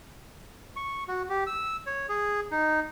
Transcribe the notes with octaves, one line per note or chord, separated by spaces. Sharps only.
C#6
F#4
G4
E6
C#5
G#4
D#4